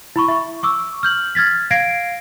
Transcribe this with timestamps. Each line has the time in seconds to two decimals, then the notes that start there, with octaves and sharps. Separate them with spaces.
0.16 E4 B5 C#6
0.28 E5 C#6
0.63 C#6 D6 E6
1.03 F6 G6 F#7
1.35 F6 G#6 A6 B6
1.71 F5 G#6 A#6 C7 D7